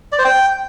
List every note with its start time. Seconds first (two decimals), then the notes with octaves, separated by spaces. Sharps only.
0.12 D5
0.19 C5
0.25 G5